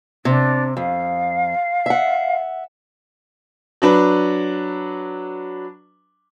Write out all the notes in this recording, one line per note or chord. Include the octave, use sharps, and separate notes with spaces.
C3 D4
F2 F5
E5 F#5
F#3 D4 B4